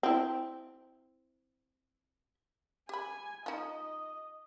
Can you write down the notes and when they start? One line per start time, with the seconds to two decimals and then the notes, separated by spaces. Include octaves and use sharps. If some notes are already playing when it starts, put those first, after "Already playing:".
0.03 C4 E4
2.89 G4 G#5 B5
3.46 D#4 F4 D#5